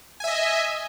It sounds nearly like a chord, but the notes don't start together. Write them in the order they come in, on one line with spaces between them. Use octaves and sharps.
G#5 E5 D#5